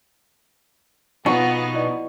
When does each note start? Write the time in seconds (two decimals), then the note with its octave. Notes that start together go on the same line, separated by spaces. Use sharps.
1.26 B2 B3 D#4 F4 F#5 C#6
1.74 E4 D5 D#5